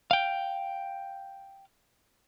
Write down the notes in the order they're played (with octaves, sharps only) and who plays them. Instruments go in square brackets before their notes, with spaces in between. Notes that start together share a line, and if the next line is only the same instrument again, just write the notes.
[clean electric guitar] F5 G5